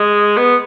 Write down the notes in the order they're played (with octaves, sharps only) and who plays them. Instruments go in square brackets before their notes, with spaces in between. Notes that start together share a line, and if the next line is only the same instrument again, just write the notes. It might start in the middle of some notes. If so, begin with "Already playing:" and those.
Already playing: [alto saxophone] G#3 [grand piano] D#5
[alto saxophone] B3